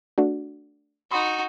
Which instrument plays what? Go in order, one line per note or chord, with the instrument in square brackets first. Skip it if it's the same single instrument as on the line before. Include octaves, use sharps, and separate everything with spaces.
[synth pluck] A3 D4 F#4
[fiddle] D#4 F#4 [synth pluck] B5 C6 D#6